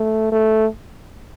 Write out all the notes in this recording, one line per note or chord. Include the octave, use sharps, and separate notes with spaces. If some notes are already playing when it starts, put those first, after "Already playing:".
Already playing: A3
A3